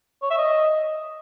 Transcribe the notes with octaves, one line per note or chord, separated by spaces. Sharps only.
C#5
E5
D#5